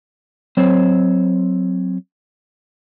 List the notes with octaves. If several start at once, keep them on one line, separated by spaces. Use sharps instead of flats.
F#3 C4 C5 C#5